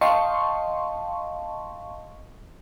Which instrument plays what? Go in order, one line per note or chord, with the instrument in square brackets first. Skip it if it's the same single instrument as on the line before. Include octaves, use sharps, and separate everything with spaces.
[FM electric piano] D#5 F5 G5 A5 C6 C#6